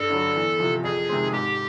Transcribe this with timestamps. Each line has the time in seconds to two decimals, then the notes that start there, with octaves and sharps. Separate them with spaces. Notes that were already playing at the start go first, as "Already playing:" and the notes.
Already playing: G2 A4
0.10 D3 F#3
0.36 E2
0.59 C3 F3
0.84 F2 G#4
1.09 C3 D#3 G#3 C4
1.33 G#2 G4